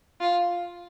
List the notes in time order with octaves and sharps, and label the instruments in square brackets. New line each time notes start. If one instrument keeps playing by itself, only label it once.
[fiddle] F4